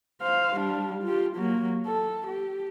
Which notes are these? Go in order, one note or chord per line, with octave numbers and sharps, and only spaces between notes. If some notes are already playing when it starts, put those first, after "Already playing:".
C5 F5
G3 D4
F4 G4
F#3 A#3
A4
G4